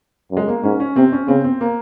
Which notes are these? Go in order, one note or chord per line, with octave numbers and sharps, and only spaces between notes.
F#2
G#3
A#3
G#2 C#4
C#4
C3 C4
C#4
C#3 C4
C4
A#3